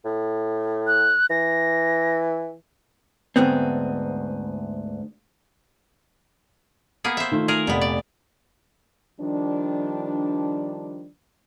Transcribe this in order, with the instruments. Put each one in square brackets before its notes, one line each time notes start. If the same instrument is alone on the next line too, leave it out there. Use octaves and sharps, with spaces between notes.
[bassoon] A2
[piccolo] F#6
[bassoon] E3 [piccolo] A#6
[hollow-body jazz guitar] D2 G#2 B3 C4
[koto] A#3 B3 G#4
C5 E5
[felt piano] D#3 A3 F4
[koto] G#4 A#4
[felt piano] F1 [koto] A#2 B3
[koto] D5
[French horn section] D#3 F3 G3 D4